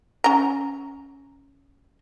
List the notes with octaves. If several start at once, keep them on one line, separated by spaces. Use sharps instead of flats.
C#4 A#5